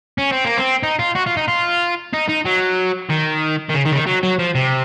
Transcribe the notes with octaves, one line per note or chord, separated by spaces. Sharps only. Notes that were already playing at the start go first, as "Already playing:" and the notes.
C#4
C4
A#3
C4
D#4
F4
F#4
F4
D#4
F4
D#4
D#4
F#3
D#3
D#3
C#3
D#3
C#3
D#3
F#3
F#3
F3
C3